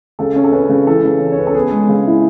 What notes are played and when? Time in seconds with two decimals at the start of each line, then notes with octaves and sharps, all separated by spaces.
0.19 C#3 A4
0.36 C#4
0.44 A4
0.52 C#4 B4
0.69 C#3
0.87 E3 A4
1.05 C#3
1.20 C#4
1.32 C#5
1.38 C#4 B4
1.47 A4
1.55 B3 G#4
1.72 G#3
1.89 C#3
2.07 E4